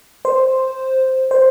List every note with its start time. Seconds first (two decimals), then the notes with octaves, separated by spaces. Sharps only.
0.25 C5
1.31 C5